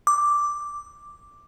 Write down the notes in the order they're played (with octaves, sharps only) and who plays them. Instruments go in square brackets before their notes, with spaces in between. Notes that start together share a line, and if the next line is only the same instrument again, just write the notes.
[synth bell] D6